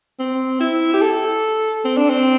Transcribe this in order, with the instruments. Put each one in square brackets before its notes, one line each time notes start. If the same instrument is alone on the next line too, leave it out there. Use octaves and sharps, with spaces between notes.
[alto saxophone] C4
E4
G4
A4
C4
D4
C4